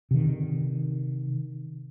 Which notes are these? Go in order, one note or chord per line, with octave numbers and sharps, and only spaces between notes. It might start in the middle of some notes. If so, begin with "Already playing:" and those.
C3 D#3